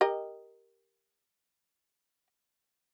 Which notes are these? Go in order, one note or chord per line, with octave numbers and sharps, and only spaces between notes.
G4 A#4 D#5